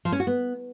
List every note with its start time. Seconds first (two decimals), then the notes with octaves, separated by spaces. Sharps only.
0.05 F3
0.12 C#4
0.20 F#4
0.27 B3